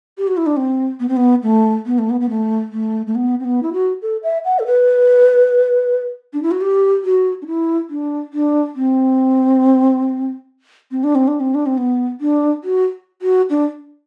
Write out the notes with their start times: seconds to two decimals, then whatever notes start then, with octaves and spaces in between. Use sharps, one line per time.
0.18 G4
0.27 F#4
0.37 E4
0.46 D4
0.57 C4
1.00 B3
1.08 C4
1.16 B3
1.43 A3
1.86 B3
1.99 A3
2.10 B3
2.21 B3
2.30 A3
2.72 A3
3.07 A3
3.15 B3
3.40 C4
3.45 B3
3.63 E4
3.73 F#4
4.02 A4
4.23 E5
4.45 F#5
4.59 A4
4.67 B4
6.34 D4
6.43 E4
6.51 F#4
6.61 G4
7.04 F#4
7.42 D4
7.47 E4
7.90 D4
8.33 D4
8.76 C4
10.91 C4
11.04 D4
11.15 C4
11.28 D4
11.40 C4
11.55 D4
11.66 C4
11.78 B3
12.21 D4
12.64 F#4
13.22 F#4
13.50 D4